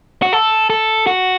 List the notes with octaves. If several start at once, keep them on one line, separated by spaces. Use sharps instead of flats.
F#4
A4
A4
F#4